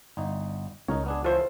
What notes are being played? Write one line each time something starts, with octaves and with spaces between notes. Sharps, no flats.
G1 D#4
C#2 D#4 A#4 C#5
B3 D4 G#4
E3 F4 A4 C5 C#5